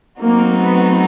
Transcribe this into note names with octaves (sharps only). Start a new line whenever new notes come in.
F#3 A3 A#3 C4 D#4 F#4
B3